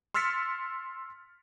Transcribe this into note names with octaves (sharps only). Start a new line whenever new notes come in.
C6 E6 F6 A6 B6 C#7